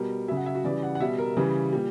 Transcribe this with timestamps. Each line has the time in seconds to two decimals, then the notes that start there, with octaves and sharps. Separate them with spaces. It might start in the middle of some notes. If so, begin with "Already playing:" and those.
Already playing: B2 G3 A#4
0.28 F#3 E5
0.32 C#3
0.37 F#5
0.46 E5
0.55 F#4
0.64 C#3 E3 G3 D5
0.83 F#5
0.95 F#5
1.00 B2 G3 E5
1.18 A#4
1.37 C#3 E3 G3
1.73 A#2 G3